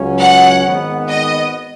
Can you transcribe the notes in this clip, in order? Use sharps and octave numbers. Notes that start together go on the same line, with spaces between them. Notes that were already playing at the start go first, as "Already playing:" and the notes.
Already playing: C#2 C#3 F#3 C#4
F#5
G#1 G#2 D#3 B3
D#5